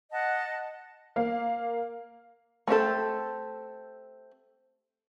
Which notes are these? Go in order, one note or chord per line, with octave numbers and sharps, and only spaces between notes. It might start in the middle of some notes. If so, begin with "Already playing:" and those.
D#5 F#5 A5
A#3 F5
A3 C4 G4 A4